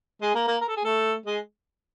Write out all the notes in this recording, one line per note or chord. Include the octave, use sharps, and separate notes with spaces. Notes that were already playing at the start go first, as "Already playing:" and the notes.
G#3 G#4
A#3 A#4
A#3 A#4
A#4
A4
G#4
A3 A4
G#3 G#4